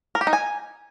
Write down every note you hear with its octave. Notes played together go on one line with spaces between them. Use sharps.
A#4
G4
D#4
G#5